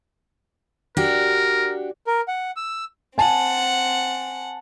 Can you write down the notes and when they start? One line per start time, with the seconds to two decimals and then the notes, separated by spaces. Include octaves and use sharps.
0.97 D4 F#4 G4 A#4
2.07 A#4
2.28 F#5
2.56 E6
3.18 C4 F#5 G#5 A5